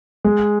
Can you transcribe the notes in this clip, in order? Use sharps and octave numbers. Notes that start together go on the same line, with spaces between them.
G#3